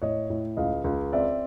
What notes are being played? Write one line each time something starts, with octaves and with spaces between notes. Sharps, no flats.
A2 C#5 D#5
A2
C#2 D#5 F5
C#2
C4 D5 E5